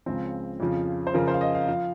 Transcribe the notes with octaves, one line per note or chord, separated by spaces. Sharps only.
C#2 C#3 F3 C4
F2 C#3 F3
C5
F2 C#3 F3 A#4
C5
F5
D#5
F5
F3 F5